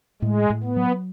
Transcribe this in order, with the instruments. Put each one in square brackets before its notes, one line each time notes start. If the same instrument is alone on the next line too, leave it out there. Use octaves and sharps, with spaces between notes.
[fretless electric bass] A2 [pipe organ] G#3
[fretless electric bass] A2
[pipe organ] B3
[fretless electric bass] F#3